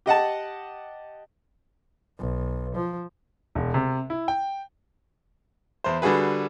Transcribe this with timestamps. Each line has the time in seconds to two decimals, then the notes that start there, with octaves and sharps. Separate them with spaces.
0.06 G4 D#5 F#5 A5
2.19 B1
2.75 F3
3.55 E1
3.74 C3
4.10 E4
4.28 G5
5.84 E2 C5
6.02 D3 G3 F#4 G#4 B4